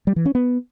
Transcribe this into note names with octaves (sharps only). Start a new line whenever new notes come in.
G3
E3
C#4
B3